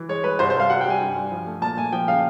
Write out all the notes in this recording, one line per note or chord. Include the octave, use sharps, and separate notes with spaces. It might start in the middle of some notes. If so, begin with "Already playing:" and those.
Already playing: E3
G#3 C#5
G#3 B4
C2 C5
C5
C2 F5
G3 F#5
G5
G3 G#5
G2
G2
F3
A3
A#2 A5
A#2 G#5
F3 G5
C#3 F5